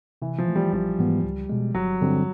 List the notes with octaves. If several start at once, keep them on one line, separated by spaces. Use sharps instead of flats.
C3 E3
F3
E3 A3
G3
A1 G3
G#2 E3 G#3 B3
C#2
B2 G#3
G1 F#3
G2 D3 G3 C4